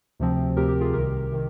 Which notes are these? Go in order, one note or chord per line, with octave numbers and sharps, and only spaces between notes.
D2 C3 F3 C4
D2 C3 F3 C4 G4 A#4
G4
F4 G#4
C2 C3 D#3 G4 A#4
C3 D#3